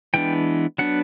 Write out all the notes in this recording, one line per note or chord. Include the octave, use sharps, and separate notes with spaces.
E3 G#3 B3 D4 G5
F#3 B3 D4 F#5